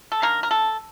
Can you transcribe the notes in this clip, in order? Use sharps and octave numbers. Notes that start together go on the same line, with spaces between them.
A4
D#3 A#3 D4 A#4
A#4
A4